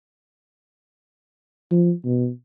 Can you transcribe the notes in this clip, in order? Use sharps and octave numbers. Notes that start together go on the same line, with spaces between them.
F3
B2